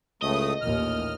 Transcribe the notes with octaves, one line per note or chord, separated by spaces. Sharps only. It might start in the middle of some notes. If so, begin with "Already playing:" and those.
C#2 A2 A3 D#5 D#6
A1 D#2 A#2 F6